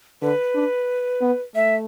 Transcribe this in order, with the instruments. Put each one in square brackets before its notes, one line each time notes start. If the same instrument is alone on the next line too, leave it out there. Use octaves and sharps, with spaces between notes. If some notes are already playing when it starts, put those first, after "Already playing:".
[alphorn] D3 [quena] B4
[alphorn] D4
B3
[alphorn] A3 [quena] E5